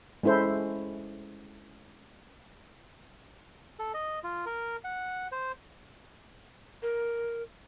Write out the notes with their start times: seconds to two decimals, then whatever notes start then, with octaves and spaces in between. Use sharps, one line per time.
0.23 G#3 C#4 E4 A4 C5
3.79 A4
3.94 D#5
4.24 F4
4.46 A#4
4.84 F#5
5.32 C5
6.82 A#4